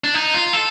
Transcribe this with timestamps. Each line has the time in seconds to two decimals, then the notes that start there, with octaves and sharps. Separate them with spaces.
0.04 D4
0.14 D#4
0.34 F4
0.53 A4